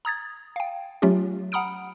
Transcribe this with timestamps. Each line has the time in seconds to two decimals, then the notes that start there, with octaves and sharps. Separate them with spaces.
0.05 A#5 D#6 G#6 A6
0.56 F5 G5
1.02 F#3 A3 C#4 F4 G4
1.52 F#5 A#5 B5 D#6 F6 D7